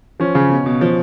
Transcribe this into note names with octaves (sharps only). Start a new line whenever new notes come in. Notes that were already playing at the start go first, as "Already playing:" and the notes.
F3 C#4
C#3
B2
B2
F3